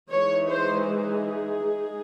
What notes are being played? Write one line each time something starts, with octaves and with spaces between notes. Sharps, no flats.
E3 G#3 D#4 C#5
C5
G#4
G#3 D#4